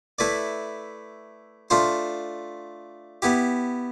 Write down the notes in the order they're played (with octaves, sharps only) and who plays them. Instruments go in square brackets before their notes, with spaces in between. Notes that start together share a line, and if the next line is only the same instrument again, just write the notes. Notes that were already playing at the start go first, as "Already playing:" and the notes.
[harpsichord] A3 E4 B4 D5
A3 D4 F4 C5
B3 E4 G4